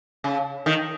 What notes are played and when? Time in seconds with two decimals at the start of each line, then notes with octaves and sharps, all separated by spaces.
0.24 C#3
0.66 D#3